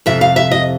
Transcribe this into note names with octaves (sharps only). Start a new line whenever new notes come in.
F2 C3 E5
F5
E5
D#5